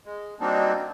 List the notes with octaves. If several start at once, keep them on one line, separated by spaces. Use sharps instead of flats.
G#3
F#3 G3 A#3 C4 D4 D#4